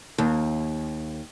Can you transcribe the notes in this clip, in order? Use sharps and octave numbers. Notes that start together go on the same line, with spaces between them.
D#2